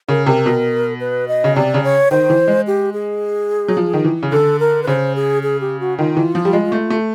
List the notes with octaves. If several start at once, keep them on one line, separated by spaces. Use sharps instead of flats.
C#3 A#4
C3 A#4
B2
B4
D#5
C#3
C3 D5
C#3
C#5
D#3 C5
E3
G#3
G4
G#4
F#3
F3
D#3
E3
C#3
D3 A4
A#4
B4
C#3 C5
G#4
G#4
G4
F#4
D#3 F4
E3
F3
G3
G#3
A3
A3